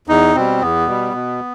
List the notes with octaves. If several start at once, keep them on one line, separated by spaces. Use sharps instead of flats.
E2 D#4
B2 G3 C4
E2 B3
B2 G3
B2